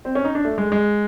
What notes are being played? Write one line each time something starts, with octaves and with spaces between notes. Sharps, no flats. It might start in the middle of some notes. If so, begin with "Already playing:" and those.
C4
C#4
D#4
D4
A3
G#3
G#3